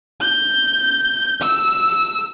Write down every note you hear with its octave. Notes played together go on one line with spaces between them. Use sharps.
G6
E6